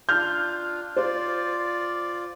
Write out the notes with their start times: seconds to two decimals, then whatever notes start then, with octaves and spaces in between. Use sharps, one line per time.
0.09 D4 F4 F6 G6
0.97 F4 C5 D5